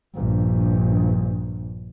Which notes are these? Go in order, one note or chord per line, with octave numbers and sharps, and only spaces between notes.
A#1 G2